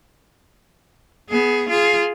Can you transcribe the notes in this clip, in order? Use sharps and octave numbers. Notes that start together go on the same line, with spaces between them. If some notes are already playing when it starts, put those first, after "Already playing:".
B3 G#4
F4 G#4